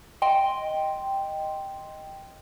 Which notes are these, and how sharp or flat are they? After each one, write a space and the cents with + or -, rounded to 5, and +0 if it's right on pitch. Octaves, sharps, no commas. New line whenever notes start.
D#5 +0 G5 +0 C6 +0